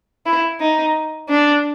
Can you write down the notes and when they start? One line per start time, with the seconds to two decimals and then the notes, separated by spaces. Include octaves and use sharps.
0.26 E4
0.61 D#4
1.29 D4